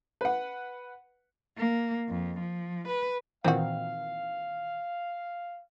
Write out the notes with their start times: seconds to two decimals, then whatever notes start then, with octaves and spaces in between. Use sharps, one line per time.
0.21 B4 F#5
1.57 A#3
2.08 F2
2.39 F3
2.87 B4
3.44 A#2 D#3 E3 C4 F#4 F5